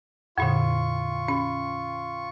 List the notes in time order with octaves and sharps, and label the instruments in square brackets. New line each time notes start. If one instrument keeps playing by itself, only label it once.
[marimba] F2 A#2 D3 [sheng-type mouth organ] F4 C#6
[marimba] C#4